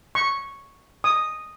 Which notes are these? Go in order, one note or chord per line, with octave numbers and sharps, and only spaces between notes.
C#6
D#6